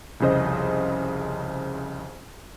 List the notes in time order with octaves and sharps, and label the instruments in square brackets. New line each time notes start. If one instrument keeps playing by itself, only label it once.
[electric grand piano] C2 F2 C#3 C5 D#5